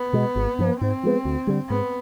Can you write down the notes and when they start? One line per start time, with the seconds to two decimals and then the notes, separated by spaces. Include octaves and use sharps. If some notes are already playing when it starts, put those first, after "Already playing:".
Already playing: B3
0.13 B2 G#3
0.36 G#1
0.59 G2 F3
0.81 G#2 C4
1.03 F3 G#3 B3
1.25 D2
1.47 D3 G3
1.69 G#2 B3